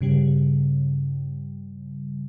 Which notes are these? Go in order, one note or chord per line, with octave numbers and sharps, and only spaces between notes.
G2 C#3 G3